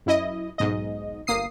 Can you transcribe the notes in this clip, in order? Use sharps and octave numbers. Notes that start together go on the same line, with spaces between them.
F#2 E4 D#5
B1 G#2 D#5
G1 A#3 D#6 C7